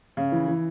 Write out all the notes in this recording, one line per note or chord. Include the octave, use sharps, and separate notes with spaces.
C#3
E3
E3